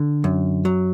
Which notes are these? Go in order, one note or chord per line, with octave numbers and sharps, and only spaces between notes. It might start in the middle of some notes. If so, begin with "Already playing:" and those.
Already playing: D3
F#2
F#3